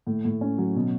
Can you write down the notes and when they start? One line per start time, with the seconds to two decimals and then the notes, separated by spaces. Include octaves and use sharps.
0.07 A2
0.25 A2
0.41 C#4
0.58 F#3
0.76 B2